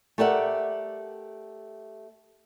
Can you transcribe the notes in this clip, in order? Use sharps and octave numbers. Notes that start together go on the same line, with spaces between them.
A3 G4 A#4 D5 E5 F#5